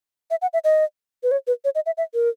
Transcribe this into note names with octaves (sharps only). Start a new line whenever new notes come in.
E5
F#5
E5
D#5
B4
C#5
B4
C#5
D#5
E5
E5
A#4